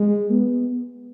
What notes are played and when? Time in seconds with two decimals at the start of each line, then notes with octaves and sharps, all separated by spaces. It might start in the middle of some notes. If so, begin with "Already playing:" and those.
Already playing: G#3
0.30 B3